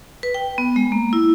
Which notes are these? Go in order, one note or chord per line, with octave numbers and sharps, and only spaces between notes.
B4
G5
B3
G#3
A#3
E4